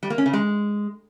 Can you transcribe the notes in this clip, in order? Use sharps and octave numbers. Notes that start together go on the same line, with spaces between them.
G3
A#3
C#4
C#3
G#3